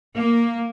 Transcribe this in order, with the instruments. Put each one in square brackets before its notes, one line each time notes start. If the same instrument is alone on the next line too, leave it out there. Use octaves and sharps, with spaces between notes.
[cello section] A#3